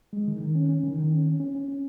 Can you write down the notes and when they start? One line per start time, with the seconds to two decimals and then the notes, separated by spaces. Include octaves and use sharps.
0.13 G#3
0.28 D#3
0.41 D#3
0.55 C#4
0.69 C#4
0.84 D#3
0.98 D#3
1.12 C#4
1.26 C#4
1.40 C#4
1.55 C#4
1.68 C#4